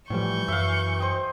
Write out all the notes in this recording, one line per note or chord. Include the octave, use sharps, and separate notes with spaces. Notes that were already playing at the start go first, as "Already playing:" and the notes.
A2 E3 F3 G3 C#6 G6
F#2 E5 F5
C5 D#5 G5